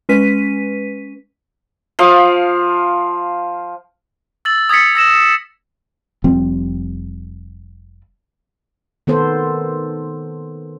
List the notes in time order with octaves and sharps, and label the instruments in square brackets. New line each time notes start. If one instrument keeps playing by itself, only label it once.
[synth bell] G#3 C#4 B4 B6 D#7
[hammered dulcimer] F3 F5
[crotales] E6 A6 F#7
D#6 G#6 A6 B6 C#7
E6 A#6 E7
[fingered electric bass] F1 F3 G3 C4
[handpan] D#3 B3 A4 C5